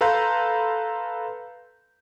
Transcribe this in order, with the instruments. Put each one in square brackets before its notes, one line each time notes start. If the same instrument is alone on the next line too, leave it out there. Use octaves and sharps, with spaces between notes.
[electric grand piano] A4 B4 F5 A#5 C6 G6